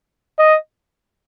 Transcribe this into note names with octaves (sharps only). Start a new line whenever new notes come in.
D#5